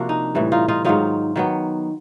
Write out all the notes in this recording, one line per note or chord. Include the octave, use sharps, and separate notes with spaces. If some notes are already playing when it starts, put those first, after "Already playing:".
Already playing: C3 F3 A#3 D4 F#4
D#4
A2 E3 G3
D#4 F4
D#4 F4
G#2 D#3 F#3 D#4 F4
D#3 F#3 B3